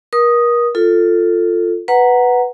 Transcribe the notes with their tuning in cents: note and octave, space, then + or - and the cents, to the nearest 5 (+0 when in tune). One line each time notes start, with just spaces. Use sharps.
A#4 +35 D#6 +0
F4 +0 A4 +10
B4 +0 F#5 +0 A#5 +0